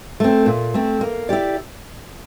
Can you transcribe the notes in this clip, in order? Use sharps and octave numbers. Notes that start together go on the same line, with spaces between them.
A3 C4
A#2
A3 C4
A#3
E4 G4 D5